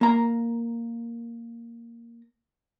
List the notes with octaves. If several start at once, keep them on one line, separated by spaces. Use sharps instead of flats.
A#3 A#5